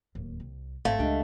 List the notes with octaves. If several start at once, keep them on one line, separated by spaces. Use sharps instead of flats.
D1 D#2
C2
G#1 A3 C4 D5 F5
C#2 G#3 D4 G4